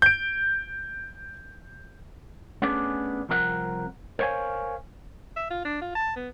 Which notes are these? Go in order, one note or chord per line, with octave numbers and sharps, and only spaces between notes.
G6 D7
A3 B3 C#4 D4 G#4 D5
C2 F3 C4 A#4 E5 F#5
A#4 C5 C#5 F5 G#5
E5
F4
D4
F4
A5
B3